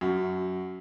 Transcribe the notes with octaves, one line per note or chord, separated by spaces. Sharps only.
F#2 F#4